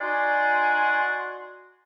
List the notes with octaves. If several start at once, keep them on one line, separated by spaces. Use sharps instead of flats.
D#4 F#4 D5 F#5 G#5 C6